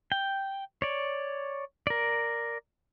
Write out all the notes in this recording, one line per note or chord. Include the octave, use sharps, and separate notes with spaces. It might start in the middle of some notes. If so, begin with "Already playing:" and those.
G5
C#5 D5
A#4 D5